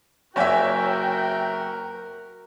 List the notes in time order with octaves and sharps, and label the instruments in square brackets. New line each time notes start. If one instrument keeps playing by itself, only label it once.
[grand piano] F#1 E5 [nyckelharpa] F#4 A#4 [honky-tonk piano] C#5 D5 G#5 [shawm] G5